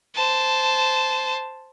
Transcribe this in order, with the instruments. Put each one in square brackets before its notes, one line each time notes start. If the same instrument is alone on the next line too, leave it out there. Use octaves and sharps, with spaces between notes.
[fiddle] C5 A5